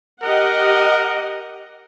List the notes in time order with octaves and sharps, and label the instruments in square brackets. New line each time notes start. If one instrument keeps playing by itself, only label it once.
[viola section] G4 D#5 F#5 [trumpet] A#4